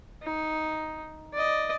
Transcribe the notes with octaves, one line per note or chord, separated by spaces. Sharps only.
D#4
D5 D#5